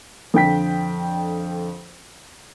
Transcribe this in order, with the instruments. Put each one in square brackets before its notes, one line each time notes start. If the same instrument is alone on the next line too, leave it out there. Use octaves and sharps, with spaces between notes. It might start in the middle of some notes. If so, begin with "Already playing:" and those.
[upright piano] F2 D3 G5 B6